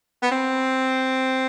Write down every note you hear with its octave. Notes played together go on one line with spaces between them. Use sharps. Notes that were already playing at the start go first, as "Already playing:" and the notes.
B3
C4